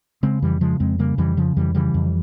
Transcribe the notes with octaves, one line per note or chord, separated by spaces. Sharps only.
C#3 G#3 C4
F2 E3 G3
C#3 F3 G#3
F2 G#3 C4
C#3 G3 A#3
F2 E3 G3
C#3 F3
F2 E3 G3
C#3 E3 G3
F2